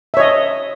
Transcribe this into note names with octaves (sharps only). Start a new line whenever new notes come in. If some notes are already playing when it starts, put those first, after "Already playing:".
C#5 D#5 E5